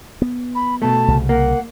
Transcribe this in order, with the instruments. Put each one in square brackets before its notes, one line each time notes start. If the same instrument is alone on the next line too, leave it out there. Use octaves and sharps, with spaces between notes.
[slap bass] B3
[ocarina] B5
[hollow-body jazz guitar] B2 A3 [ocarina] A5
[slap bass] C2 C#3
[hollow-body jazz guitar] A#3 [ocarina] F#5